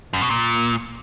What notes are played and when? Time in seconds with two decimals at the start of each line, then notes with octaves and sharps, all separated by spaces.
0.13 F#2
0.22 B2
0.30 A#2